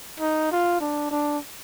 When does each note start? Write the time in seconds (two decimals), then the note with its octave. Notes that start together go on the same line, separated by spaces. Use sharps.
0.20 D#4
0.52 F4
0.81 D4
1.11 D4